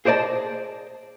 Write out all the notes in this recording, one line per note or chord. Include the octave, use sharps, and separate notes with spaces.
G#4 C5 D5 D#5 A5